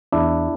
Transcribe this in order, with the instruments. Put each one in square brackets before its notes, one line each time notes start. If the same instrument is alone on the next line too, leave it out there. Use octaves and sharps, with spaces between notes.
[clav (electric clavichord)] E2 D4 E4